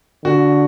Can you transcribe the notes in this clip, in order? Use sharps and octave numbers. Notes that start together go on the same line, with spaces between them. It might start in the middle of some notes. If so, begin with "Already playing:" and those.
D3 F#4